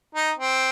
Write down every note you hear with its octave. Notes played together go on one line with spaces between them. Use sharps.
D#4
C4